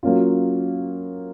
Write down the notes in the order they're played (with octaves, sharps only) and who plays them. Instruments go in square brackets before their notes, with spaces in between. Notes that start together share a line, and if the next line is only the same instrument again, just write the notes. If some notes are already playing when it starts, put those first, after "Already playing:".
[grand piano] F#3 A#3 C#4 F4